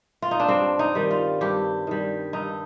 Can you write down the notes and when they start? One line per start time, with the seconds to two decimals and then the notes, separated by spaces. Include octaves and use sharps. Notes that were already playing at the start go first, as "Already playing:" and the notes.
0.22 F4
0.31 D#4
0.40 D4
0.48 G2 C4
0.79 D#4
0.95 D#3 G3
1.10 F4
1.41 G2 G4
1.87 D#3 G3
2.33 G2 D#4